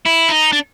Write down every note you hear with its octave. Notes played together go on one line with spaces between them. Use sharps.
E4
D#4
D4